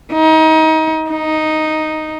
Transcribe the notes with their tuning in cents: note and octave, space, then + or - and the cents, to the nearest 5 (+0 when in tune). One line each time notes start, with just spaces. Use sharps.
D#4 +30
D#4 +0